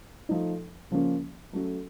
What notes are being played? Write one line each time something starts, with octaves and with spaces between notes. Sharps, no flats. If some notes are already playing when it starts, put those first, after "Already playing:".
F3 A3 D#4
C#3 F3 A#3 C#4
F#3 A3 C#4 F#4